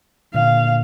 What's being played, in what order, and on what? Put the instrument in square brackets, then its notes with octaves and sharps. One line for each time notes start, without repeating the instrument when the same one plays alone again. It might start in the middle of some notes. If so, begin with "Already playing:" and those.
[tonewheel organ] A#2 D3 [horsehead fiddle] F5